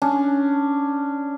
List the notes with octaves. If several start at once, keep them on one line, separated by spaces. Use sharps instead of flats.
C#4 D4